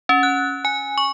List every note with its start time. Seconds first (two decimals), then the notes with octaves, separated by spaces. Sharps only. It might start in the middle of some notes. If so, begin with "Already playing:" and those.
0.09 C#4
0.23 F#6
0.65 G#5
0.98 C#6